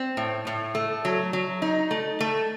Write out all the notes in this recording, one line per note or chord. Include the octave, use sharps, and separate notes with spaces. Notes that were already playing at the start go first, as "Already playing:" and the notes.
Already playing: C4
A2
A2
A3
F#3
F#3
D#4
A3
A3